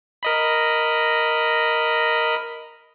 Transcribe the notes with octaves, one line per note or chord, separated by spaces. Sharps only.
A#4 D#5 B5